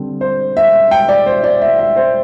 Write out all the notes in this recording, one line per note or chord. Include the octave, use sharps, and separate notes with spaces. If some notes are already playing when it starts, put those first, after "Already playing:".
Already playing: D3 G3 C4
C5
E5
G5
D5
C5
D5
E5
E5
C5